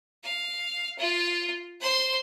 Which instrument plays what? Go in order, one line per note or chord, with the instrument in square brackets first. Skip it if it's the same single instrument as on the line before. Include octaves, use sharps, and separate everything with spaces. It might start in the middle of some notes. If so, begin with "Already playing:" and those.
[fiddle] F5
F4
C5 C6